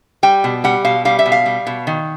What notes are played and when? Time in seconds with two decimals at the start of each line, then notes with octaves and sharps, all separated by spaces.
0.23 G3 G5
0.44 B2
0.64 G3 F#5
0.85 B2 F5
1.05 G3 F5
1.19 E5
1.26 B2
1.32 F5
1.46 G3
1.67 B2
1.87 D#3